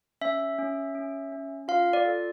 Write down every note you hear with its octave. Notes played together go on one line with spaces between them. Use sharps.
C#4 E5
C#4
C#4
C#4
F4 F5
D5
A4